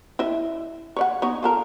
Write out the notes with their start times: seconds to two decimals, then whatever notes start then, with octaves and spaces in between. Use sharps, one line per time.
0.19 E4 D#5 E5
0.96 C#5 D5 F#5
1.22 B3 D#4 C#5
1.43 F4 A4 A#4